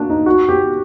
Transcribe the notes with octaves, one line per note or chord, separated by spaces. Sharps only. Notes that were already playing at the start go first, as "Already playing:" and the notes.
Already playing: A#3 D4 F#4
D#4
F#4
G4